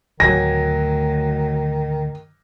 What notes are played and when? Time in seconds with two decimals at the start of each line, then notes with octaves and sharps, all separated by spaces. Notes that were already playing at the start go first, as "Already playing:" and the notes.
0.20 D2 A2 D#3 F#3 G#5 A#6